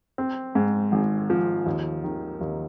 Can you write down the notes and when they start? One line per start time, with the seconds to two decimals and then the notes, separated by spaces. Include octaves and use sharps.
0.18 C4
0.55 G#2
0.92 G#1
1.30 F3
1.66 D#2
2.03 D#3
2.41 D#2